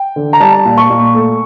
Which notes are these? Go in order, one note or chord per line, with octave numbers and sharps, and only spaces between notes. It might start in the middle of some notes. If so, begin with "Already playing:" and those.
Already playing: G5
D3
A#5
G3 A5
A#2
C#6
A#2
A3